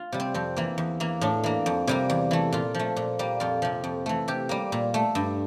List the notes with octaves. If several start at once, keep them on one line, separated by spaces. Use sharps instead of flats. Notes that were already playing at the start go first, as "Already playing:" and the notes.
Already playing: F4
C3 G3
C4
F2 C4
E3 A#3
E2
E3 A#3
A2 D4
E3 A#3
F2
C3 G3 A#3
E2
E3 A3
A#2 F4
F3 A3
A#2
G3 A#3
F2 F4
C3 F3
F2
E3 A3
C3 G4
G3 A#3
A#2
A3
G2